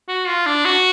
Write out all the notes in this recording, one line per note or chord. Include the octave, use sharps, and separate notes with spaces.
F#4
F4
D4
F#4